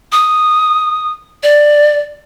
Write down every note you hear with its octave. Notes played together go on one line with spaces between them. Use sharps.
D#6
D5